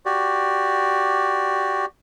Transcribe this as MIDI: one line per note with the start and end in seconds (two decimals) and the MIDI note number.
0.06 1.86 66
0.06 1.86 67
0.06 1.86 74